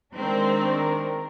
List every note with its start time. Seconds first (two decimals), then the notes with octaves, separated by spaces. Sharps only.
0.14 D#3 G#3 C4 D4 A#4